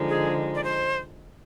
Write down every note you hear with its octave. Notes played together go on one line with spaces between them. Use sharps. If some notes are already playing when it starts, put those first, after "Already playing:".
Already playing: D3 F3 G#3 D#4
G#4
D5
C5